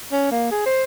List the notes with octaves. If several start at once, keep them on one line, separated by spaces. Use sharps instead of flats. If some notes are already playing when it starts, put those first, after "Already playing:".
C#4
A#3
G#4
C5